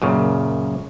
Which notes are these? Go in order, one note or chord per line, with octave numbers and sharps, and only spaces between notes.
F#2 A#2 C#3